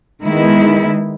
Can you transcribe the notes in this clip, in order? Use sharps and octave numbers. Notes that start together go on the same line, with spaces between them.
D#3 G#3 B3 E4